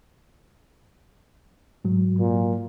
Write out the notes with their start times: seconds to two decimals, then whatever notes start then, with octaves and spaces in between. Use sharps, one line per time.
1.85 G#2 F#3
2.18 A#2